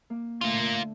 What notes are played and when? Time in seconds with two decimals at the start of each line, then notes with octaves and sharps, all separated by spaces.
0.10 A#3
0.41 D3 A3 A#3 F4